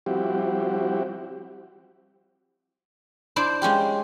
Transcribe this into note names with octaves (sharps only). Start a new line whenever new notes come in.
F3 G3 C4 E4 F#4 G4
D4 E4 C5 D5
G#3 C#4 F4 G4